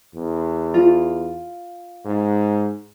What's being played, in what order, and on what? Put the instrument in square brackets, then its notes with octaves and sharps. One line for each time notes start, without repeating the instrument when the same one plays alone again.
[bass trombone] E2
[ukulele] F4
[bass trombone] G#2